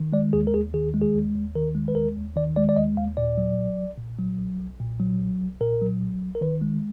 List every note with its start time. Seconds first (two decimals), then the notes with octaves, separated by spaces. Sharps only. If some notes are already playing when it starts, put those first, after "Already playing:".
Already playing: D#3
0.12 G#3 D5
0.33 D#2 G#4
0.47 A#4
0.54 D#2 G#4
0.73 D#3 G#4
0.94 G#3
1.02 G#4
1.15 D#2
1.35 D#2
1.55 D#3 A#4
1.75 G#3
1.88 B4
1.95 D#2 A#4
2.16 D#2
2.36 D#3 D5
2.56 G#3 D5
2.69 D5
2.76 D#2 D#5
2.97 D#2 F5
3.17 A#2 D5
3.37 F#3
3.58 B1
3.78 B1
3.98 A#2
4.19 F#3
4.39 B1
4.60 B1
4.80 A#2
5.00 F#3
5.20 B1
5.40 B1
5.60 A#2 A#4
5.81 F#3
6.01 B1
6.22 B1
6.35 A#4
6.41 D#3 B4
6.61 G#3